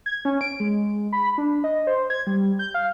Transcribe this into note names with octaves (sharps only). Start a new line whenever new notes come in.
G#6
C#4
D7
G#3
B5
D4
D#5
C5
G#6
G3
G6
F5